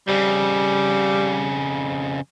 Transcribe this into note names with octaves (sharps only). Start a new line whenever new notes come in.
F2 C#3 G3